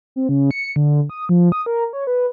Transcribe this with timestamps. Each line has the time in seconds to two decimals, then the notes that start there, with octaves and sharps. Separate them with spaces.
0.16 C4
0.29 C#3
0.51 C#7
0.76 D3
1.10 D#6
1.29 F3
1.52 D#6
1.66 A#4
1.93 C#5
2.07 B4